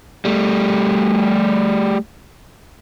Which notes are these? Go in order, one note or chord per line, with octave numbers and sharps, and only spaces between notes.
G3 A3